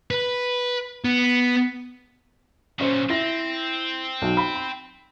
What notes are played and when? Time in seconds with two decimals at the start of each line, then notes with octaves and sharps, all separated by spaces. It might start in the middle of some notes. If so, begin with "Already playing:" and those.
0.11 B4
1.04 B3
2.79 A#2 F#3 C#4 C5
3.09 C4 E4 A#6
4.22 B1
4.37 B5
4.55 B5